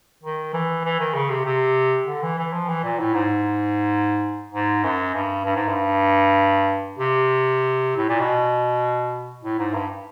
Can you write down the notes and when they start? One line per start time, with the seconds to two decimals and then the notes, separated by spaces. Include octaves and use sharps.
0.23 D#3
0.53 E3
0.84 E3
1.00 D#3
1.15 C#3
1.30 C3
1.45 C3
2.07 D3
2.22 E3
2.38 E3
2.53 F3
2.69 E3
2.84 A#2
2.99 A2
3.14 G#2
4.52 G#2
4.84 F#2
5.14 G2
5.45 G2
5.56 G#2
5.68 G2
6.99 C3
7.97 A2
8.09 A#2
8.20 B2
9.43 A2
9.59 G#2
9.74 G2